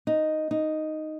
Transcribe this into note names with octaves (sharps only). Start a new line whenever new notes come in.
D#4
D#4